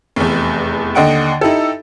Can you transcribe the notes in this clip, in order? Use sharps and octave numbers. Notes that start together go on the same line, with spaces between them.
F1 E2
D#2 D3 D#5 F#5 G5 D7
D#4 E4 G4 A4